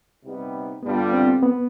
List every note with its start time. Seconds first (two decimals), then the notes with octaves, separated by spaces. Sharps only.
0.23 C3 G3 B3 D#4 G4
0.83 G2 D3 G3 B3 D4 F4
1.12 C4
1.42 B3